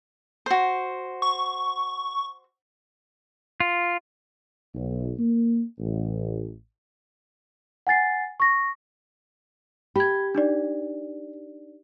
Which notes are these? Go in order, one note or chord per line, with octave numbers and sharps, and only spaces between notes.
F#4 C5
C#6
F4
B1
A#3
A1
F#5 G#5 A6 C7
C#6 A#6
G4 B5 G#6
D4 D#4 D5